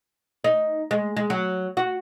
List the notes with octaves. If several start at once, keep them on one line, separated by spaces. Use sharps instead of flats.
D#4
G#3
G#3
F#3
F#4